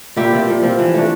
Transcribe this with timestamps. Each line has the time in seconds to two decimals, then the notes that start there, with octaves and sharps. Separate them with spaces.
0.16 A#2 E4 G4
0.32 F3 C4
0.48 A#2
0.63 F3 C4
0.79 E3
0.94 A3 D4